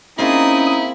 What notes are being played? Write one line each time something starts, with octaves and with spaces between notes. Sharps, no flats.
A#3 C4 C#4 D#4 E4 G#4 D#6